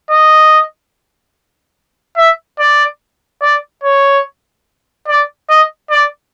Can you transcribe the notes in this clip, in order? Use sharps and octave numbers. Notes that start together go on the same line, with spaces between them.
D#5
E5
D5
D5
C#5
D5
D#5
D5